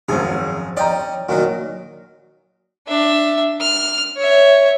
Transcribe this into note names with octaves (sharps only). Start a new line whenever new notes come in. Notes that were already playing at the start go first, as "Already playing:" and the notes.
G#1 F#2 F3 G#4
C#4 D5 D#5 G5 A#5
A#2 D#3 F#3 F#4
D4 E5
F6
C#5 E5